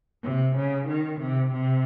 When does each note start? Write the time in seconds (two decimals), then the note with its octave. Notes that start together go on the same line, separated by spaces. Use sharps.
0.23 C3
0.56 C#3
0.88 D#3
1.20 C3
1.52 C3